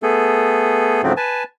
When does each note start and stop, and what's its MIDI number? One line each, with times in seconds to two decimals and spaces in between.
0.03 1.02 57
0.03 1.02 59
0.03 1.02 68
0.03 1.02 69
1.03 1.13 44
1.03 1.13 49
1.03 1.13 53
1.03 1.13 54
1.03 1.13 57
1.03 1.13 60
1.17 1.43 71
1.17 1.43 80
1.17 1.43 81